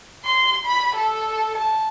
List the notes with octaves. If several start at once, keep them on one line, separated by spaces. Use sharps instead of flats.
C6
B5
A4
A5